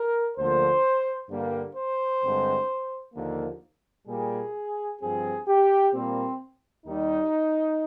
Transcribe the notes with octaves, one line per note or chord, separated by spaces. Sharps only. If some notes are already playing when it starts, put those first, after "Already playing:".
Already playing: A#4
D2 D3 F3 A#3 C5
G2 D3 G3 A#3
C5
G2 D3 G#3 C4
D#2 D3 F3 A#3
A#2 G3 A#3 G#4
G2 F3 C4 G#4
G4
A#2 G3 A#3 C4
D#2 D#3 G3 D#4